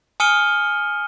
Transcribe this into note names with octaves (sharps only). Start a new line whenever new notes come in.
G#5 D#6 F6 C#7 D#7 G7